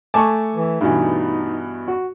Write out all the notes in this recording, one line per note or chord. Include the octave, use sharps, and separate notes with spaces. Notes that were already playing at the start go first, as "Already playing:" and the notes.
A3 G#5 A5 C#6 D6
E3
G2 B2 E3 D#4
F#4